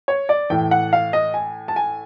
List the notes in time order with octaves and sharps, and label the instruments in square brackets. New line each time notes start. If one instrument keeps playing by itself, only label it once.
[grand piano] C#5
D5
A2 E3 G5
F#5
F5
D#5
G#5
A5
G#5